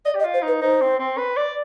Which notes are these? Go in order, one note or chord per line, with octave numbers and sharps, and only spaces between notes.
D5 D#5
G4
D#5
F4
C5
D#4 B4
D#4 C5
C4
C4
B4
D5